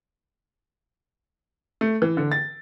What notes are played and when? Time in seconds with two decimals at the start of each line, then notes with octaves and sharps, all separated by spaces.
1.81 A3
2.02 E3
2.17 D3
2.32 A6